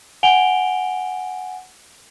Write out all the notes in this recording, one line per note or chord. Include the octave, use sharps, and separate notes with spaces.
F#5 G#5 D7 F7 G7